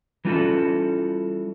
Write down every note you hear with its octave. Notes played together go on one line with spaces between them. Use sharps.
E3 G3 C#4 F4 F#4 A4